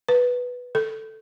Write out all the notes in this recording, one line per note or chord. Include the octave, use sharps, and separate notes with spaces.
B4
A4